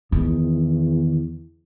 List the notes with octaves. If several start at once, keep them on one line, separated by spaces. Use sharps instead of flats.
E2 D#3